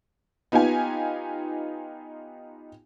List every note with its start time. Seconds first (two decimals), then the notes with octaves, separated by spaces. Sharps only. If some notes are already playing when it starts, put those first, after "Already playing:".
0.52 B3 D#4 F4 G4 G#5